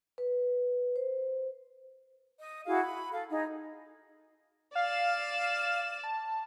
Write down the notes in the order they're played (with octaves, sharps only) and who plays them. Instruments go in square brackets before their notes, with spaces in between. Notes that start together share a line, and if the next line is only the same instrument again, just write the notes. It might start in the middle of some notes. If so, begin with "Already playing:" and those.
[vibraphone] B4
C5
[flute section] D#5
E4 F#4 G#4 F5
B5
A4 F5
D#4 G#4
[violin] D5 E7 [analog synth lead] F5
[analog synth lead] A5